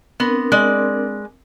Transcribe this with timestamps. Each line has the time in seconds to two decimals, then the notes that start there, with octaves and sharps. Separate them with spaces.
0.20 B3 C4 D4 A#4
0.52 G#3 D5